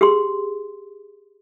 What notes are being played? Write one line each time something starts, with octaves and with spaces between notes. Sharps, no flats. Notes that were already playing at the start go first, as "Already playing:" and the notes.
G4 G#4 C6